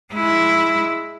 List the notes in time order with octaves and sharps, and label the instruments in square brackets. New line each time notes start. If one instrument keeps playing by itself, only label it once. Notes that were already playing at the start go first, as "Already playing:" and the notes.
[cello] G#3 E4